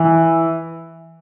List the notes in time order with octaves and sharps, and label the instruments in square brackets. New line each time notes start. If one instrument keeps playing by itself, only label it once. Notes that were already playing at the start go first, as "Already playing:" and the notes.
Already playing: [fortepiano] E3